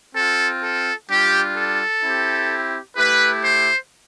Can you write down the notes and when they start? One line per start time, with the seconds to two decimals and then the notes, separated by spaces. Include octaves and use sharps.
0.14 C4 F4 A4
0.61 A4
1.08 G3 D4 F4 G4
1.55 A4
2.03 C4 E4 G4
2.96 A3 E4 G4 B4
3.43 C5